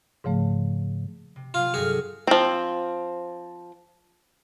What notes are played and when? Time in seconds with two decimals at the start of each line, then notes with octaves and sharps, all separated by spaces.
0.24 G#2 C#3 F3 A3
1.36 C3
1.54 C3 F#3 F4 F6
1.74 G1 G2 F#4 G#4
2.27 F3 C4